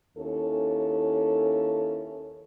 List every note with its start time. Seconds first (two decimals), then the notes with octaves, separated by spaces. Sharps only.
0.18 D#2 C#4 E4 A4